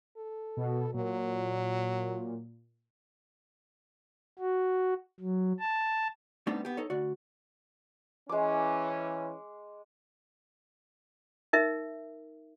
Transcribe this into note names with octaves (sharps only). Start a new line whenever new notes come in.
A4
B2
A#2 F#3
F#4
F#3
A5
G3 A3 B3 C4 D4 D#4
B3 G4
D#4 A4 C#5
D2 F#4 D5
E3 G#3 C#4 D6
D#4 A#4 E5